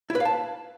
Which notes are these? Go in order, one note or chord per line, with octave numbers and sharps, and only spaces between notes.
E4
B4
F5
A5